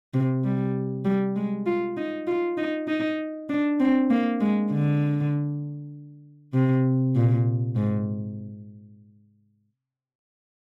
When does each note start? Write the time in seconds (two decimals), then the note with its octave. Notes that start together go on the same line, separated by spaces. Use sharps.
0.14 C3
0.44 G3
1.05 G3
1.36 G#3
1.66 F4
1.97 D#4
2.27 F4
2.58 D#4
2.88 D#4
3.49 D4
3.80 C4
4.10 A#3
4.41 G#3
4.71 D3
6.54 C3
7.16 A#2
7.76 G#2